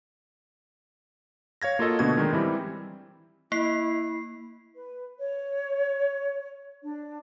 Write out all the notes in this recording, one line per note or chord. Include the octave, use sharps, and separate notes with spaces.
C#5 F5 G#6 A#6
A#3 F4 F#4 A4 D#5
B2 D3 A3 B3 F#4 G#6
D#3 G#3 D4 D#4
E3 G3 C4 E4
A#3 E4 C7
B4
C#5
D4